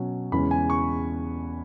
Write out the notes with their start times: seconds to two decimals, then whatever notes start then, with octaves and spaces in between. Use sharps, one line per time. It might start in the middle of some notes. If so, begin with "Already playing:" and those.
Already playing: B2 F#3 C#4
0.32 E2 C#3 E3 G#3 C#4 B5
0.51 G#5
0.70 C#6